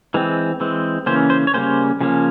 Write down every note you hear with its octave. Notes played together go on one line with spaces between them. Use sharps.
E3 G#3 C4
E3 G#3 C4
C#3 E3 A#3 C#4 C5
C5
C#5
C#3 G3 A#3 C#4 C5
C#3 F3 A#3 C#4